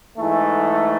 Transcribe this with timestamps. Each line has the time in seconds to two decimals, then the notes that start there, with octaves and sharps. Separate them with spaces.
0.18 G#2 E3 A3